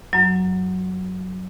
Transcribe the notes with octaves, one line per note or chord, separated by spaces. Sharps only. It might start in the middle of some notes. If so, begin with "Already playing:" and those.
F#2 F#3